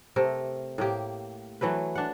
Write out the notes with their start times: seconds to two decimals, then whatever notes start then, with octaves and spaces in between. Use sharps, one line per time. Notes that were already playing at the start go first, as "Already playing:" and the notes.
0.16 C3 A3 A#4
0.78 A2 A#3 G4
1.61 E3 F#3 A3 B4
1.95 D4 F#5